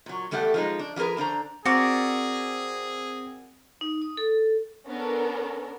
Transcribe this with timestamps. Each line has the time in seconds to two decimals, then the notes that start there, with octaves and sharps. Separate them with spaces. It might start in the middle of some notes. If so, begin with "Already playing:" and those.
0.06 A#2 F#3
0.31 E2 G3 A3 G4 A4 F#5
0.54 F3 G#3 D#4
0.79 D4
0.96 F3 F#3 G#4 A#4 B4
1.17 D3 D4 C5 A#5
1.65 C4 F#4 G#4 A#4 D5
3.81 D#4
4.02 D#6
4.17 A4
4.87 B3 C#4 D4 A4 A#4